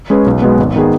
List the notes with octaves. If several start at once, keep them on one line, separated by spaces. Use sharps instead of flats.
G#3 C#4 G#4 B4
B1
B2 G#3 B3
G#1
D#3 B3 G#4